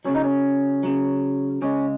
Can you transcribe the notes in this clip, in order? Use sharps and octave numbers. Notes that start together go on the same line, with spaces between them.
C#3 F#3 C#4
D#4
C#4
C#3 F#3
C#3 G#3 C#4